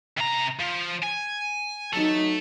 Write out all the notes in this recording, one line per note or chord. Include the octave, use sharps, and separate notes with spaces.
C3 A#5
F3
G#5
F#3 A3 D#4